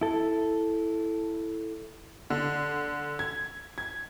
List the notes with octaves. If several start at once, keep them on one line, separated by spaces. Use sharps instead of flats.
E4 A4
D3
G#6
G#6